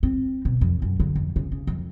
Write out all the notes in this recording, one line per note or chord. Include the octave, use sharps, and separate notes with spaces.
C4
B2
F2
F#2
D3
F2
C#3
C#3
F2